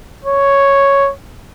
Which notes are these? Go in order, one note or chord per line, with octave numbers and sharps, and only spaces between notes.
C#5